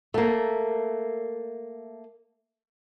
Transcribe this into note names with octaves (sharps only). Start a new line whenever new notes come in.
A3 A#3